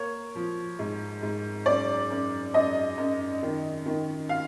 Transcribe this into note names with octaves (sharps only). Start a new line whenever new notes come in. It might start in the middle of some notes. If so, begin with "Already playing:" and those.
Already playing: A#3 C#5
F3
G#2
G#2
F#2 D5
F#2
F#2 D#5
F#2
D#3
D#3
F5